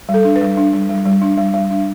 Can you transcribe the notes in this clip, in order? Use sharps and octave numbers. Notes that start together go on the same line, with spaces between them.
G3
A4
D4
B4
G3
D4
G3
G3
G3
D4
G3
G3
D4